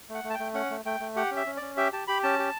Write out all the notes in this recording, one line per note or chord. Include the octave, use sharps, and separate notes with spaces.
A3
F#5
A3
A5
G5
A3
C#4 F#5
A3
A3 G5
A3
G4 F#5
C#4
E5
C#4
C#4 D5
G4 E5
G4 A5
G4 B5
C#4 A5
G4